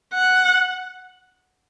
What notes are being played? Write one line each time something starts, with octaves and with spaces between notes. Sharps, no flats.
F#5